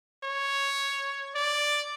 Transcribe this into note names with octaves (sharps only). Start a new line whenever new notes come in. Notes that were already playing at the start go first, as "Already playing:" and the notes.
C#5
D5